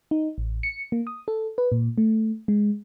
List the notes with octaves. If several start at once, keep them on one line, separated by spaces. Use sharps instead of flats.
D#4
A1
C#7
A#3
D#6
A4
B4
A#2
A3
G#3